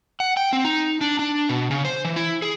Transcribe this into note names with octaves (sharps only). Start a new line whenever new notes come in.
F#5
G5
C4
D#4
D4
D4
B2
C#3
C5
E3
E4
G#4